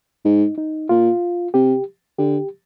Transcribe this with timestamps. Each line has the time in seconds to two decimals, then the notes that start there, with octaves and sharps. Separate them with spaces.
0.25 G#2 D#4
0.58 D#4
0.89 A#2 F4
1.54 C3 G4
2.18 D3 G4